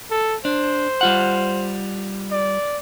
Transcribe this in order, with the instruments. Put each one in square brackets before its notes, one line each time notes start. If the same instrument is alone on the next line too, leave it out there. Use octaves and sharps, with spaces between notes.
[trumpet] A4
[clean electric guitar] D4 [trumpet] C5
[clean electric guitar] G3 F4 F#5
[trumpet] D5